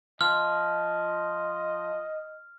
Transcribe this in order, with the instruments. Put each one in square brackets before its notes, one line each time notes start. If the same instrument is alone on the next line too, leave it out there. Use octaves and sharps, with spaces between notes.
[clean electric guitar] F3 [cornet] D#5 [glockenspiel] F6